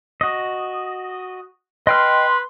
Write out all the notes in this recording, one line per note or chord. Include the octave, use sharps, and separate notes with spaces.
F#4 D#5
B4 D#5 G5 C6 F6